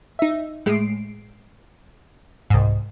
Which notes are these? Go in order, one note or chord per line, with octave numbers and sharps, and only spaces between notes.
D#4 E5
A2 G#3 C7 D7
C2 G#2